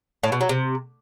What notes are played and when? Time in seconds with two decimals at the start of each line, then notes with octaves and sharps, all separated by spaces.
0.23 A2
0.32 B2
0.41 F#3
0.49 C3